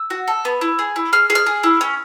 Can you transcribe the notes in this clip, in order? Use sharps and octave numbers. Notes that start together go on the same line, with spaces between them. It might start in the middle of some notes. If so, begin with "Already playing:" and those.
Already playing: E6
F#4
A4
B3
E4
G#4
E4
G#4 F6
G#4
F6
G#4
E4
C#4